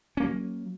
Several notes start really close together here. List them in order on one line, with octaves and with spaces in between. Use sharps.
C#4 A#3 F#3